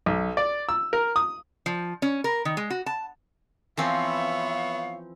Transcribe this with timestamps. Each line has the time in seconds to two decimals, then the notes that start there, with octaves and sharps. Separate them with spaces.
0.06 B1
0.37 D5
0.69 E6
0.93 A#4
1.16 D#6
1.66 F3
2.02 C#4
2.24 A#4
2.45 D#3
2.57 G#3
2.70 F#4
2.86 A5
3.77 E3 F3 B3 C4 C#5 E5 F5